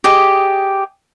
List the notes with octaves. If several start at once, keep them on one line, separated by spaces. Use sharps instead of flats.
G4 G#4 D#5